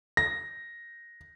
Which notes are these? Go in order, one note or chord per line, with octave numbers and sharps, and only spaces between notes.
A#6